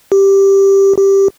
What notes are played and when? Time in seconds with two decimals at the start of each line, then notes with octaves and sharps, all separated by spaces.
0.12 G4
0.98 G4